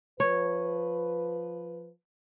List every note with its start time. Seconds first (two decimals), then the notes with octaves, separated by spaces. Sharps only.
0.20 F3 B4 C#5